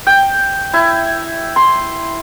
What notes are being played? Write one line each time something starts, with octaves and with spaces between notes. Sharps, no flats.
G5
E4
C6